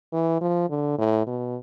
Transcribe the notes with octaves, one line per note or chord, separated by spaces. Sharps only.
E3
F3
D3
A2
B2